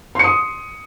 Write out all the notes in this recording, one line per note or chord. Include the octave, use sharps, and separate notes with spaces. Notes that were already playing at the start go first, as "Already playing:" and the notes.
C6 D#6 C#7